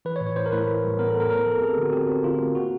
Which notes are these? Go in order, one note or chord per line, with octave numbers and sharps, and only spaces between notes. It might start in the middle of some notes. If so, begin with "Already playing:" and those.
E3 B4
C#5
A2
C#5
A2 C5
A#4
A2 B4
A2
G3
B3 A#4
B3 A4
A#4
A3 A#4
F3 A4
C4 G#4
D3 F#4
C4 G4
C4
D3 F4
A3
A#3 F#4